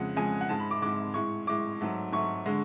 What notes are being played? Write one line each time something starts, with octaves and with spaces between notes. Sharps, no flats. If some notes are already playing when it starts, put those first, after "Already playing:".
Already playing: F2 C#3 G#3 F#5
F2 C#3 G#3 G#5
F#5
G#2 G#3 A5
B5
D6
G#2 G#3 D6
A2 G#3 C#6
A2 G#3 D6
G#2 F#3 A3
G#2 F#3 A3 C#6
D3 G#3